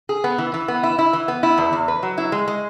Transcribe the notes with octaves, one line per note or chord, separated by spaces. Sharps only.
G#4
B3
E3
E3
B3
E4
E4
E3
B3
E4
E2
E2
B4
F#3
E4
G#3
G#3